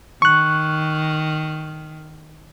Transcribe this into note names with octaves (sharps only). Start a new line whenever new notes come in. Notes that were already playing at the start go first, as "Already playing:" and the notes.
D#3 C#6 F#6